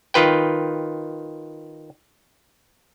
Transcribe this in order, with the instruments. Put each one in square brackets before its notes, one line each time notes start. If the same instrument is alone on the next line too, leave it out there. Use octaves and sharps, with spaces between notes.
[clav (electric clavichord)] D#3 F4 B4 G5